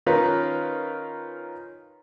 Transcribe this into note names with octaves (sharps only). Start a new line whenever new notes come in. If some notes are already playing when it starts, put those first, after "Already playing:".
D#3 C#4 D#4 F4 A#4 B4